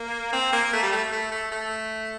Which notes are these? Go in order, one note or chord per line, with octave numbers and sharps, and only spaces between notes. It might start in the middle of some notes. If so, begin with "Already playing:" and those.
Already playing: A#3
C4
A#3
A3
G3
A3
A3
A3
A3